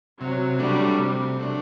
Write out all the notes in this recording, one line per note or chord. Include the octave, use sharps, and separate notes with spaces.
C3 F#3
F#3 G3 A3 D4
C3
F#3 A3 D4